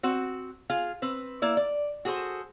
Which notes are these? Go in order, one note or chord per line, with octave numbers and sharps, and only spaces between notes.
C4 F#4 F#5
F4 G#4 F5
C4 B4
A#3 E4 D5
D5
F#4 G#4 A4 B4 C5